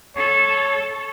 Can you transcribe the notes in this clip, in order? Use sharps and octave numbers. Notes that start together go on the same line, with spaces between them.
A4 C#5